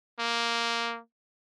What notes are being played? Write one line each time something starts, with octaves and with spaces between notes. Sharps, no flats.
A#3